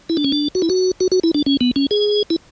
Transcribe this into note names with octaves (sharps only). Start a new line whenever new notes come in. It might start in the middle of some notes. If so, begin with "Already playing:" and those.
E4
D4
C#4
D4
F#4
E4
F#4
F#4
F#4
E4
D4
C#4
B3
C#4
G#4
E4